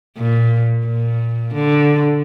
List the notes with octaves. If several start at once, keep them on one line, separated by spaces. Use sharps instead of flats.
A#2
A#2
D3